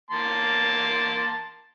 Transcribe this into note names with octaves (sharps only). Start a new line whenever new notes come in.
A#3 A5 C6